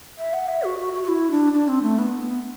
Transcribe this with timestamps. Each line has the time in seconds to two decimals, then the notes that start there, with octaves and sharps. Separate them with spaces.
0.18 E5
0.33 F#5
0.48 E5
0.63 F#4
0.78 F#4
0.93 F#4
1.04 F#4
1.08 E4
1.31 D4
1.53 D4
1.68 C4
1.83 A3
1.99 B3
2.20 B3